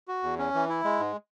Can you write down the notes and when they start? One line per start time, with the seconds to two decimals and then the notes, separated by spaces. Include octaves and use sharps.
0.08 F#4
0.23 E2
0.38 C#4
0.54 E3
0.69 E4
0.84 G#3
1.00 G#2